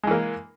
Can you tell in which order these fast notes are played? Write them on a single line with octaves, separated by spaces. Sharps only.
G#3 E3 A#3